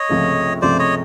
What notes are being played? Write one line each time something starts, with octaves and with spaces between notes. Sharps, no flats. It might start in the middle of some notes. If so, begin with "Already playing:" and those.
Already playing: C#5 D#5
C#2 C3 F3 A3
C#2 C3 F3 A3 C5 D5
C#5 D#5